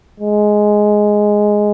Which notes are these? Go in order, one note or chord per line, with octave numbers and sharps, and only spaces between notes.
G#3